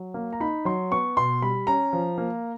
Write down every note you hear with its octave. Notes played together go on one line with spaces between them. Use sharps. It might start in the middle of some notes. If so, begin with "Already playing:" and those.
Already playing: F#3
A#3
A#5
D#4 B5
F#3 C6
B3 C#6
B2 C6
G3 B5
C#4 A#5
F3
A#3